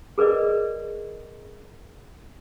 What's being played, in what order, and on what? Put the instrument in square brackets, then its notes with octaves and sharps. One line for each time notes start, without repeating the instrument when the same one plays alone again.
[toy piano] G#4 A#4 B4 D5 D#5